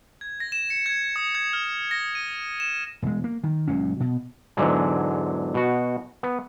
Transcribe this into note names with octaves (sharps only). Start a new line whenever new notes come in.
G#6
A#6
E7
C#7
G#6
D#6
G#6
F6
A#6
D#7
E7
E1 G#3
A#3
D#3
F#1 C#2 A#2 C#4
B2
E2 G#2 D3 F#3 G#3
B2 F#4
B3